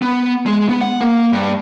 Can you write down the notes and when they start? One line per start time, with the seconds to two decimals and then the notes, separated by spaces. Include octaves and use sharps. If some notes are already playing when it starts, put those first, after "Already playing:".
0.02 B3
0.46 G#3
0.69 B3
0.81 F#5
1.01 A#3
1.33 G2